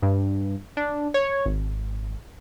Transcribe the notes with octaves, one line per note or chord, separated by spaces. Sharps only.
G2
D4
C#5
G#1